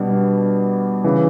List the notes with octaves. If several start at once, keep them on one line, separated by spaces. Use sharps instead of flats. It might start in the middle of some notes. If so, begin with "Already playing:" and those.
Already playing: B2 G3 D4
C#3 E3